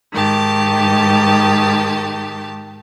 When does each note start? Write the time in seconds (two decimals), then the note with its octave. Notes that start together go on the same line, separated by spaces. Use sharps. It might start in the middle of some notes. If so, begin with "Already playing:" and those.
0.12 G#2 D#3 G4 A5